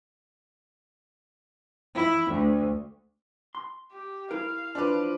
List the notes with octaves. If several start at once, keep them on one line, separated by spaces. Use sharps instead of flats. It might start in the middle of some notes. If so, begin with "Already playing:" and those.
E4
D2
C6
G4
E4 A#4 F5
F3 D4 B4 D6